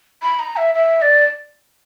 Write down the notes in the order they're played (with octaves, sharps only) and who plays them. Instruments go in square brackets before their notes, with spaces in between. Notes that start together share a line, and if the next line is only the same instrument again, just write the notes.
[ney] B5
A#5
E5
E5
D5